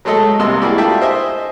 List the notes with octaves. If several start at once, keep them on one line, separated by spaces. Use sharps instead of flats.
F#3 G#3 A3 A4 D#5
C2 C3 A#3 D#5 C6 E6
G3 A#3 E4 F#4 G#4 D5
A3 D4 F4 G4 E5 G5
C5 D#5 E5 G#5